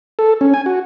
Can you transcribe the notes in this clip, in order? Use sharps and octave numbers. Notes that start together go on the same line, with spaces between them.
A4
C#4
G#5
F#4